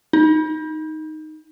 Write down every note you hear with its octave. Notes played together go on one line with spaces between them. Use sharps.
D#4